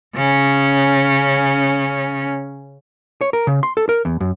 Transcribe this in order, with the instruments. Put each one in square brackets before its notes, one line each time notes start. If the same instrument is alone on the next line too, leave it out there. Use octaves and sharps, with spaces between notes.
[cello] C#3 C#4
[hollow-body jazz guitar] C#5
A#4
C#3
C6
A4
A#4
E2
F#2